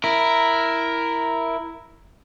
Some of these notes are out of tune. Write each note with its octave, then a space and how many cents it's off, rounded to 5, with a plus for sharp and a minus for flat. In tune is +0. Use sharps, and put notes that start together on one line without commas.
E4 +0 A#4 +0